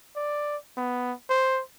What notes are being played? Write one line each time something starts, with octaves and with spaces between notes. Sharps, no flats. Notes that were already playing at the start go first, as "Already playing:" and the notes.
D5
B3
C5